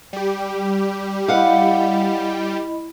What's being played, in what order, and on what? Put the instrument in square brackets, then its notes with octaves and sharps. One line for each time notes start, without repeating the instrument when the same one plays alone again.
[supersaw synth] G3 G4
[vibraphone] E4 D#5 B5 [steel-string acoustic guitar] F5 F#5